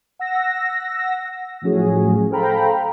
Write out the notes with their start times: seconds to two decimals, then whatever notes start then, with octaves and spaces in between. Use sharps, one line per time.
0.19 F#5 E6 A#6
1.62 A2 F3 F#3 C#4 F#4 G#4
2.31 A4 C5 F5 G5 A#5 B5